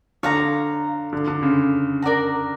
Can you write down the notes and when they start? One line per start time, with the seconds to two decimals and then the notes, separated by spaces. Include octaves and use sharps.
0.23 D3 C#5 F5 A#5
1.13 D3
1.28 D3
1.43 C#3
2.02 A#4 D5 F#5 A#5